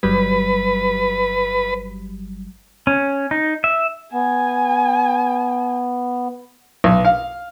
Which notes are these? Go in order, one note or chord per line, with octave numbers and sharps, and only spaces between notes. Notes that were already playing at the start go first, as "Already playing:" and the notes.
G1 F#3 G3 B4
C#4
D#4
E5
B3 G#5
B1
F5